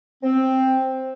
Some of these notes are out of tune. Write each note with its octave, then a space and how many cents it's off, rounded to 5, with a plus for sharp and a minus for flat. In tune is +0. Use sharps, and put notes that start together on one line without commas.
C4 +5